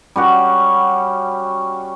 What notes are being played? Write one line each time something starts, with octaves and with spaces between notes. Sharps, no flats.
G3 C#4 F#4